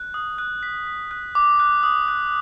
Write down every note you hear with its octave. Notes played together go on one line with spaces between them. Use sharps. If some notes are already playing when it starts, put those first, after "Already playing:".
Already playing: F#6
D#6
F#6
B6
B6
F#6
D6
F#6
D#6
F#6